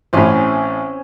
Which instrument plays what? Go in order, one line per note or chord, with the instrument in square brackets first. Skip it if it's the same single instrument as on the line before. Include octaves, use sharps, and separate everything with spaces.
[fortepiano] A1 A2 [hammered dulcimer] C4 C#4 G#5